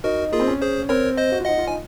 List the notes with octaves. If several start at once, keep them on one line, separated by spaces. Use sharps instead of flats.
D#4 F#4 A#4
A#3 F4 G#4
C4
C#4
G#4 C5
C4 A#4 C#5
C5 D#5
F#4
F4
D#4 D#5 F#5
F4
D#4 G#5